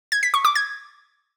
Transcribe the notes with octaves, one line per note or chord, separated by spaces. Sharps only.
G#6
B6
C#6
D6
G#6